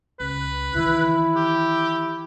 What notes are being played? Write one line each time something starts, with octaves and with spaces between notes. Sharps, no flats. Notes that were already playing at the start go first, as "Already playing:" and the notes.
C#2 B4
D#3 E3 E4
G4